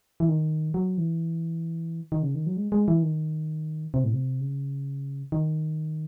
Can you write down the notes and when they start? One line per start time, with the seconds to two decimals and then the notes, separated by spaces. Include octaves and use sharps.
0.20 E3
0.29 D#3
0.74 F#3
0.98 E3
2.12 D#3
2.23 C#3
2.35 D#3
2.47 F#3
2.57 G#3
2.72 G#3
2.88 E3
3.03 D#3
3.94 C3
4.04 A2
4.13 C3
4.40 C#3
5.32 D#3